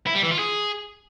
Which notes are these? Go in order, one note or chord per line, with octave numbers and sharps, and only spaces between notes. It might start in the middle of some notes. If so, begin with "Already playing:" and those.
E4
G3
E3
F4
G#4